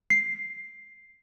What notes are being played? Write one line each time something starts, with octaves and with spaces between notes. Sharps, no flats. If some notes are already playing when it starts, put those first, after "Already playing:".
C7